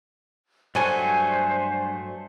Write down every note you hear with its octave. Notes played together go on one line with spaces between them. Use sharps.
G2 F#3 A3 C5 D5 G#5